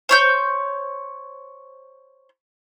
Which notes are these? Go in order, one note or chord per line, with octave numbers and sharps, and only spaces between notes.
C5 C#5 G6